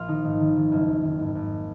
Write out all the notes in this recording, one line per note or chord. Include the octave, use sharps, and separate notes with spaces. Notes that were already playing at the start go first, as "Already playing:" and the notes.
Already playing: A#1 A#2 F4
D#3 D#4
G#1
D#3
D#3
F#1 A#3
F2
D#3
G#1
G#1